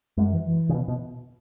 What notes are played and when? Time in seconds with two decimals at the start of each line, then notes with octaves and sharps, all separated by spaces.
0.17 F#2 G#3
0.32 E3
0.46 E3
0.69 C#3
0.74 B2
0.88 B2